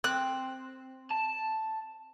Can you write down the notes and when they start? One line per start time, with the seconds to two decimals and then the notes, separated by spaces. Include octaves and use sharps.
0.04 C4 F#6
1.11 A5